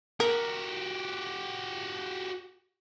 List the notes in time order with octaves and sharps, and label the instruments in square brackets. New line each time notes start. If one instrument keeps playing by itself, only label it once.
[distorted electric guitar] F#4 G4 [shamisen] A#4